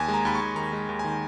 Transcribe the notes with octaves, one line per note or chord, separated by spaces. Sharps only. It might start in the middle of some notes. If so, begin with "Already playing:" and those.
Already playing: D#2 G#5
G#3
A#5
D#2 B5
C#6
D#2
D#3 A#5
G#3
D#2
G#5
D#3